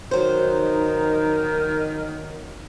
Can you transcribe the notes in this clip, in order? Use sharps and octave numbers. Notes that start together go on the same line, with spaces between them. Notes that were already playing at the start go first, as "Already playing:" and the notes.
D#3 F#3 D#4 C5